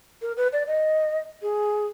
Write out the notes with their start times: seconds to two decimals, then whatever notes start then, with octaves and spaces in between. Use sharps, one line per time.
0.22 A#4
0.37 B4
0.53 D5
0.67 D#5
1.42 G#4